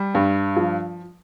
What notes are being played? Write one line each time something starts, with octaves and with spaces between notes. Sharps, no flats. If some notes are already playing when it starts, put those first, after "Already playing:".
Already playing: G3
G2
F3